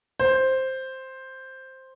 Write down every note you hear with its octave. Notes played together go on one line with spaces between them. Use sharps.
C5